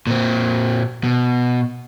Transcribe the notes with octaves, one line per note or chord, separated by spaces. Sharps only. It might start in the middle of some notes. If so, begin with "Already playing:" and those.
A#2 C4
B2